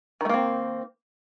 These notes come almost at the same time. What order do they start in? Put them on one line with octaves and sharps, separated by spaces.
D#3 A3 A#3 C4